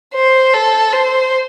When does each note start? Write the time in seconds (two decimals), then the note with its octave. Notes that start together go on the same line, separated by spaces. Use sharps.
0.14 C5
0.54 A4
0.93 C5